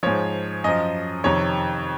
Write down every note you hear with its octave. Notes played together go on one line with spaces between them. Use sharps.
G#2 F3 C#5
F#2 F3 D#5
F2 C3 D#3 C#5